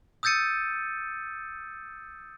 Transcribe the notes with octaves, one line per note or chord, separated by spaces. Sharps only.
D#6 E6 G6 A6 C#7 D#7